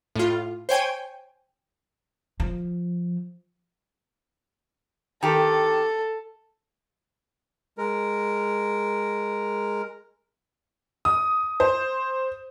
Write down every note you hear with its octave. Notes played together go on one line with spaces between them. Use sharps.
A2 F4
C5 C#5 G5 G#5
F3
D#3 G4 A4
G#3 A#4
D#6
C5